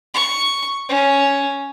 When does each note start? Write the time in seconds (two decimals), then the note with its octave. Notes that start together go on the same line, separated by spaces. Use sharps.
0.14 C#6
0.89 C#4